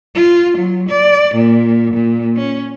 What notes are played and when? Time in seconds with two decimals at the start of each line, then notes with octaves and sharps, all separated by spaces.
0.15 F4
0.58 F#3
0.90 D5
1.35 A#2
1.94 A#2
2.36 C#4